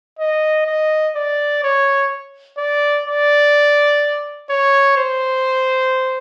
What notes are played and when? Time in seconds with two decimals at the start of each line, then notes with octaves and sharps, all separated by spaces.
0.19 D#5
0.67 D#5
1.15 D5
1.63 C#5
2.58 D5
3.06 D5
4.50 C#5
4.97 C5